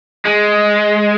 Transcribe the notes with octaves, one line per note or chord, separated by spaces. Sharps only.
G#3